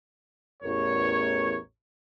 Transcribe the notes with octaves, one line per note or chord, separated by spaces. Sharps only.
A1 E2 A#4 C#5